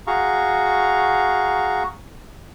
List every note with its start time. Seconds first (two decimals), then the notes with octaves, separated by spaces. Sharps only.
0.07 F#4 G#4 F5 A#5 C#6